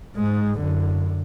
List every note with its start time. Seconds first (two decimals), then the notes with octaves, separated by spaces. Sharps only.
0.16 G#2 G#3
0.58 F#2 D3